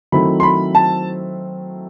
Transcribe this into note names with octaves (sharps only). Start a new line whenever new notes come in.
D#3 F#3 A3 C4 E4 B5
C6
B5
A5